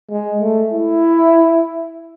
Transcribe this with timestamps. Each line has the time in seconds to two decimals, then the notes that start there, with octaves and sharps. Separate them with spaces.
0.10 G#3
0.41 A3
0.73 E4